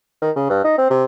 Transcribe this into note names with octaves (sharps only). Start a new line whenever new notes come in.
D#3
C#3
G2
D#4
C4
C3